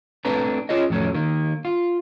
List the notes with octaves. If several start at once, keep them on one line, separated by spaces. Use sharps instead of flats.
A3 C4 D4 B4 A#5
C#4 F4 G#4 C#5 D#5
F2 A2 F#3 A3 C#4
D#3 A#3
F4